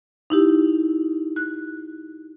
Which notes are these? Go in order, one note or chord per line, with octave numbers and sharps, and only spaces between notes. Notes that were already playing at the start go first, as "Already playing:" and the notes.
D#4 E4 G4
F#6